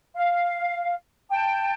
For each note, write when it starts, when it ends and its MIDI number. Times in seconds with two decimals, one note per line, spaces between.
0.15 0.92 77
1.30 1.74 79
1.30 1.74 81